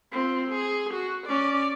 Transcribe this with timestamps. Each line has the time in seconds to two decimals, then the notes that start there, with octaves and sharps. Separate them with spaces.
0.12 C4 F4
0.48 G#4
0.94 F#4
1.27 C#4 D5